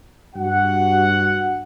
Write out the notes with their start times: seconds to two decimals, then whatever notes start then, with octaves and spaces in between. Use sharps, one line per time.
0.35 G2 F#4 F#5